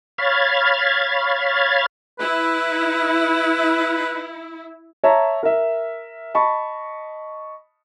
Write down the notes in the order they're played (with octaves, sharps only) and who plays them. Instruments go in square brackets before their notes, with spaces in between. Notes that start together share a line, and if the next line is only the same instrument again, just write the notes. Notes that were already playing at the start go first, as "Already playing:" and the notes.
[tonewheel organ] C#5 F5 B5 F6 G#6 A6
[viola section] E4 [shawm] B4
[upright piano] C#5 E5 A5 A#5
A#4 E5
D#5 A5 B5 C#6